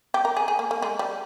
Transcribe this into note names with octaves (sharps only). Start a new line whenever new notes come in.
G4
A#4
G#4
G#4
A#3
A#3
G#3
G3